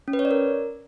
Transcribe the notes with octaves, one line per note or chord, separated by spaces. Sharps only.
C#4
B4
C#5
D5
A#4